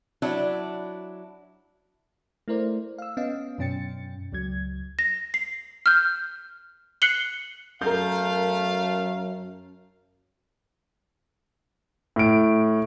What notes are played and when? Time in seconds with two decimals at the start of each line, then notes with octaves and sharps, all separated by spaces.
0.22 F#3 D4 E4
2.48 A3 E4 A#4 C5 D5
2.98 F5 E6
3.17 B3 C#4 D#5 F5
3.58 F#2 B2 C#4 G5 A6 C#7
4.32 C#2 F#3 G#6
4.99 A#6
5.34 C7
5.86 F6 G6
7.02 F#6 C7 C#7 F#7 G7
7.82 F#2 A3 A#4 F5 G6
12.16 A2 D7